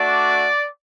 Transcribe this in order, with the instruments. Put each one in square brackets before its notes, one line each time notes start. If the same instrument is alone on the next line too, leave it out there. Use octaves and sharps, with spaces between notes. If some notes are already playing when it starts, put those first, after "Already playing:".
Already playing: [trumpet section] A3 D4 F#4 D5